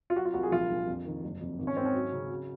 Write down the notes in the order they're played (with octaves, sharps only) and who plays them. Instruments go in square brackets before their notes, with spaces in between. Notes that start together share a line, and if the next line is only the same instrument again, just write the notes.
[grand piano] F4
F#3 F#4
F4
C2 F#4
G#4
A#1 F4
A#1
F2
D#3
F#1
F2
G#1
C#4
G#1 C4
C#4
F#3
C#3
F#3